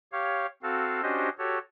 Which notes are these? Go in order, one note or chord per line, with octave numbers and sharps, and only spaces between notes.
G4 C#5 F5
C4 F#4 A4 F5
C#4 D4 F#4 G4 C5 D#5
F#4 G4 A4 C#5